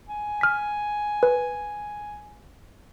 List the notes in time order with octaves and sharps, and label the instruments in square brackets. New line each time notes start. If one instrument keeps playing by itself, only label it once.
[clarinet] G#5
[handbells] F6 B6
B4